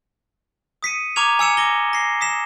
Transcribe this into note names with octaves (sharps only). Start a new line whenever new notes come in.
D#6 B6 C#7 D#7
A#5 C#6 D6 F6 G#6 F7
G#5 E6 C#7 E7
D6 A#6 G7
A#6 C7 G7
D#6 B6 E7